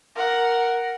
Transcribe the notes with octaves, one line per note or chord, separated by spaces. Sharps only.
A#4 F#5